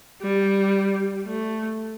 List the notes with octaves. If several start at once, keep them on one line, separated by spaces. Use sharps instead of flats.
G3
A3